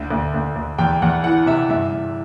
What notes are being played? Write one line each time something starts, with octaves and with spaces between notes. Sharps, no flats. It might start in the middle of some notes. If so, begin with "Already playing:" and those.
Already playing: D2 D3
D2
D2
D2
E2 G5
E2 F#5
E3 F#5
C3 E5
G2 E5
G2